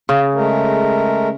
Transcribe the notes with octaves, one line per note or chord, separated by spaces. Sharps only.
C#3
G#3 A3 A#4